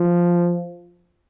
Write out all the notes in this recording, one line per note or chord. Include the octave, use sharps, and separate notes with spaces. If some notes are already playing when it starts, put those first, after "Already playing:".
Already playing: F3